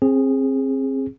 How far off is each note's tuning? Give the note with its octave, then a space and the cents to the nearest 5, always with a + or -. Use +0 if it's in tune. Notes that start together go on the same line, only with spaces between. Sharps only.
C4 +30 G#4 -10